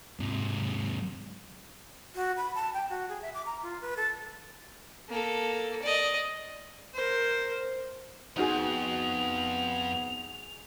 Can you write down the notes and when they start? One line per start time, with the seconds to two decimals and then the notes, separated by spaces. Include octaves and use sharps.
0.20 G#2 C3
2.15 F#4
2.37 B5
2.55 A5
2.74 G5
2.89 F#4
3.09 G#4
3.22 E5
3.34 D6
3.46 A#5
3.62 F4
3.81 B4
3.97 A4
5.09 A#3 A4
5.82 D5 D#5
6.94 A#4 C5
8.37 F2 B3 D#4 F#4 G#4 F7